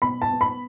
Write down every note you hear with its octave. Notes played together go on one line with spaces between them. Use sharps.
B2 B5
A5
B3
B5